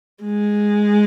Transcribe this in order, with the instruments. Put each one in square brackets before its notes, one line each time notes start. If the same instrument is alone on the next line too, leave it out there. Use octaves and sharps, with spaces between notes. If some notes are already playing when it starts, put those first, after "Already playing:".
[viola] G#3